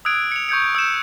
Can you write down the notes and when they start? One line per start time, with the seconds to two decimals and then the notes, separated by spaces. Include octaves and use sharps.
0.05 D#6 E6 F#6 G#6 D7
0.31 C#7 F7
0.49 C#6 G6 G#6 C#7
0.75 E6 G6 E7